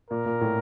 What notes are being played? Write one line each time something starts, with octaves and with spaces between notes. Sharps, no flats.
A#2 A#4
A#2
A2